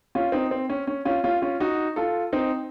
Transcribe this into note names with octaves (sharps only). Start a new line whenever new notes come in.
C#4 F4
C4 D#4
C4
C#4
C#4
C#4 F4
C#4 F4
C#4 F4
D#4 F#4
F4 A4
C4 D#4